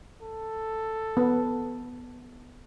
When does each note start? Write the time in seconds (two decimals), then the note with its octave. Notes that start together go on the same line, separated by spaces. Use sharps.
0.22 A4
1.17 B3